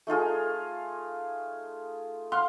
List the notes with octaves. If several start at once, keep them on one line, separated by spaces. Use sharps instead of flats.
A3 D#4 F4 G#4
F5 F#5 C6